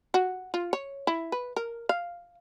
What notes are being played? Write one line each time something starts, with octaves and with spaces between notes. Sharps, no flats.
F#4
F4
C#5
E4
B4
A#4
F5